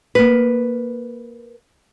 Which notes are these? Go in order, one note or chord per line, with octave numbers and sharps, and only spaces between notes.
A#3 B4